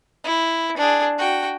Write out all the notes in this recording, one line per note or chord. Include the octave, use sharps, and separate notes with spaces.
E4
D4 G#4
F#4 G5